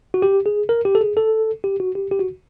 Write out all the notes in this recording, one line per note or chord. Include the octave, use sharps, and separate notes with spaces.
F#4
G4
G#4
A#4
G4
A4
G#4
A4
G4
F#4
G4
G4
F#4